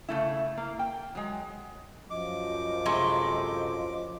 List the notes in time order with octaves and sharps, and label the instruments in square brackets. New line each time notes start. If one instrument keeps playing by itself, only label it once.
[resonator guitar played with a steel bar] C#3 A3 E4
A#3
G5
F#3 G#3
[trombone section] F#2 F3 [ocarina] D#5 [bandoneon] D6
[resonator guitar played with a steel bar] A2 C3 G#3